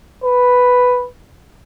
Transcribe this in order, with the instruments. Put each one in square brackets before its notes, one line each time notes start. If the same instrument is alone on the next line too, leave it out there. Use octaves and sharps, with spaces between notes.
[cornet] B4